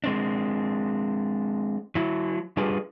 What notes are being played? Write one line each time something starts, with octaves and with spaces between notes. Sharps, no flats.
G#3 C4 D4
F#3 E4
G3 D4 F4 G#4 B4